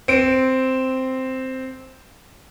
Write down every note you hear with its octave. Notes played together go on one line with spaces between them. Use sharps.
C4 D7